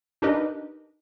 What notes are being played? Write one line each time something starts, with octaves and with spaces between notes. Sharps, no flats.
D4 D#4 G4 A#4 B4 D#5